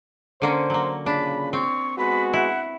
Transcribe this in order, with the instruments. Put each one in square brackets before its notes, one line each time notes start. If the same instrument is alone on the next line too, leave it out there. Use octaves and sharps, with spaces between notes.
[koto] D3 A#3 C#4 [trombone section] C5
[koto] F#3 A#3
[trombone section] A#2 C#3 [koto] D4 [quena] B5
[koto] C4 [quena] C#6
[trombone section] G#3 B3 F#4 [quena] B5
[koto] E4 [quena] F#5